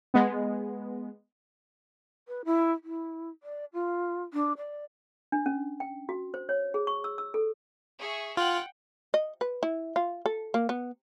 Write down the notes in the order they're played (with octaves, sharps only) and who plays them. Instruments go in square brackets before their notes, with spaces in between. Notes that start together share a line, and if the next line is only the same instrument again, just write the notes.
[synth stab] G#3 B3
[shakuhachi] B4
E4
E4
D5
F4
D4
D5
[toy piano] D4
C#4
G5
F#4
C5
C#5
G#4
C#6
E6
E6
A4
[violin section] G#4 E5 C#6
[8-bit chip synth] F4 [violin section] F#5 G5 F#6
[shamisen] D#5
B4
E4
F4
A4
A#3
B3